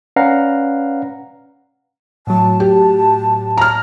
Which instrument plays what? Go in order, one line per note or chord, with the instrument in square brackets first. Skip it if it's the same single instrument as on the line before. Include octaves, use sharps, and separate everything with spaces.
[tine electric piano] C#4 B4 D5 F5 F#5 A#5
[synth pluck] A2 F#3 [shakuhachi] A5
[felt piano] G4
A#5 F6